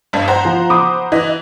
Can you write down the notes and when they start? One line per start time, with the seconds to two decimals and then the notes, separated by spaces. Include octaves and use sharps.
0.13 F1 G2
0.28 C5 F#5 A#5
0.45 F3
0.70 B5 D6 D#6
1.12 E3 D#5